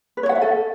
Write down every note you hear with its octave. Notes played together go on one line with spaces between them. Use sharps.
B4
C#5
F#5
E5
A4